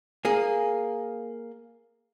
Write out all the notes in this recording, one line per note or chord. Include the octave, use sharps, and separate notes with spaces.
A#3 G#4